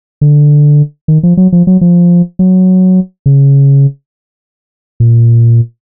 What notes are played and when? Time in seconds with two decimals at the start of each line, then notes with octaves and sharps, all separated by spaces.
0.21 D3
1.08 D#3
1.23 F3
1.37 F#3
1.52 F3
1.67 F#3
1.81 F3
2.39 F#3
3.26 C#3
5.00 A#2